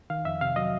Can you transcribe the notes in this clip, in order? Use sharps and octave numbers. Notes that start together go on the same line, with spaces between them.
D#3 F5
F2 E5
C3 F5
F#3 D#5